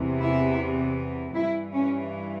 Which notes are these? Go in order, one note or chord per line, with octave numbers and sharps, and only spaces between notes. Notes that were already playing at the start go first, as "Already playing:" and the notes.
Already playing: E2 C3 E3
E4
G2 E3 E4
C#4